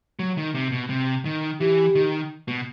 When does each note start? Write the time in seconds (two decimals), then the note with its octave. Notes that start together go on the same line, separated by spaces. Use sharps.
0.19 F#3
0.38 D#3
0.55 C3
0.72 B2
0.89 C3
1.25 D#3
1.60 E3 G4
1.95 D#3
2.48 B2